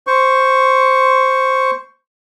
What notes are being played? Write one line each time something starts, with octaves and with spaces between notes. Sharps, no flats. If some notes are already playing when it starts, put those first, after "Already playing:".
C5 C#6